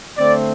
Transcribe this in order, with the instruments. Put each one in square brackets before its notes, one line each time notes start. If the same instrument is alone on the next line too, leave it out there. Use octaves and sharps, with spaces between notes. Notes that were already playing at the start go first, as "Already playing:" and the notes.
[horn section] D3 A3 C4 D5